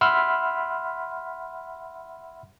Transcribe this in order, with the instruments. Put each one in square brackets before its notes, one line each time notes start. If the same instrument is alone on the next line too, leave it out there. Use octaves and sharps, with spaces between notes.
[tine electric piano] E5 F#5 B5 C6 E6 F6